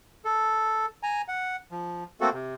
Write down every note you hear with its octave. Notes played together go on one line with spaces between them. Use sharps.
A4
G#5 A#5
F#5
F3
A3 A#3 C4 F#4 A4
C3